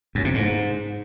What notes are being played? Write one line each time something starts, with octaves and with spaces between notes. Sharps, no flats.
F#2
C3
G#2